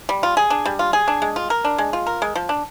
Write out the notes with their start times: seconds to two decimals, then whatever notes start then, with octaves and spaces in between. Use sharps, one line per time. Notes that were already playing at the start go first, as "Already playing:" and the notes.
0.09 G3
0.23 F4
0.37 G#4
0.50 D4
0.65 G3
0.79 F4
0.93 G#4
1.08 D4
1.22 G#3
1.36 F4
1.50 A#4
1.65 D4
1.78 G#3
1.93 F4
2.07 A#4
2.22 G#3
2.35 F3
2.49 D4